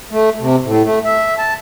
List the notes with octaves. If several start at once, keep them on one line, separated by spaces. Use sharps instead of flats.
A3
C3
A2
A3
E5
A5